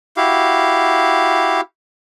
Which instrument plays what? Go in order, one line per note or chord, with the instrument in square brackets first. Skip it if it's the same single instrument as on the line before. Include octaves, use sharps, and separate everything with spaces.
[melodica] E4 F#4 G4 F5